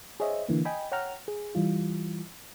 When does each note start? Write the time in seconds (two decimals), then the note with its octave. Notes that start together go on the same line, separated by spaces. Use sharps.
0.20 G#4 C5 C#5 D#5 E5
0.49 D3 E3 A#3
0.65 D#5 G5 G#5 B5
0.92 C#5 F#5 G5 A#5 F6
1.28 G#4
1.55 E3 G3 F4